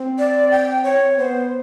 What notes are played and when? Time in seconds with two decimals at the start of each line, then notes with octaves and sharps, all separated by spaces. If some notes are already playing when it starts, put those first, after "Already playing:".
Already playing: C4
0.19 D5
0.51 G5
0.84 C#5
1.17 B3 C5